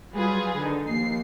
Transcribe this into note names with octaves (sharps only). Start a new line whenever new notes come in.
F#3 G3 F4 G#4 B4
D3 D#3 D#4
D#2 F3 C7